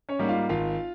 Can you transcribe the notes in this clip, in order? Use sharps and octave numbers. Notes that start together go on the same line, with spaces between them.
C#4 C#5
G#2 G3 A#3
F4 F5
G#1 F4 F5